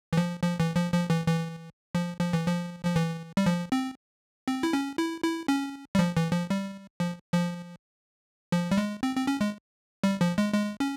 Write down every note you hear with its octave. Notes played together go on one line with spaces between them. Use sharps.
E3
F3
F3
E3
F3
F3
E3
E3
F3
F3
E3
F3
F3
E3
G3
F3
C4
C4
E4
C#4
E4
E4
C#4
G3
F3
E3
F3
G3
F3
F3
F3
G3
G#3
C4
C4
C#4
G#3
G3
F3
G#3
G#3
C#4